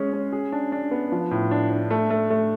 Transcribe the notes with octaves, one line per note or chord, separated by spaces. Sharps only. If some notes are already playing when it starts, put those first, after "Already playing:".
Already playing: G#3 C#4 G#4
C#4
G#4
D4
D4
B3
F3
A2
D4
D4
A3
A3
A3